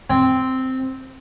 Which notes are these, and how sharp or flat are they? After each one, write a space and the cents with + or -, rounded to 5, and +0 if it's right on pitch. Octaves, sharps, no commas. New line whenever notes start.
C4 -5 G5 +0